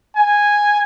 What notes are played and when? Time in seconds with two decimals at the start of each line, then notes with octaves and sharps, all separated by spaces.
0.16 G#5